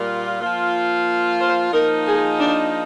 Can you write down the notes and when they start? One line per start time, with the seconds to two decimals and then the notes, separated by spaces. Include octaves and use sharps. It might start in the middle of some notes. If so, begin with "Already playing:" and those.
Already playing: A#2 G3 A#3 F4
0.41 F3 A#3 F4
1.40 C5
1.73 F3 A#3 D#4 A#4
2.07 G#4
2.40 D4